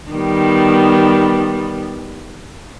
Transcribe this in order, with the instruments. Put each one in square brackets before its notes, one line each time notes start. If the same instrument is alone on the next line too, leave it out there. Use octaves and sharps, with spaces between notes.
[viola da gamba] D#3 G3 B3